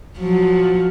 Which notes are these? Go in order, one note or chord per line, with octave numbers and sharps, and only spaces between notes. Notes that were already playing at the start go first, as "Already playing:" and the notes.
F3 F#3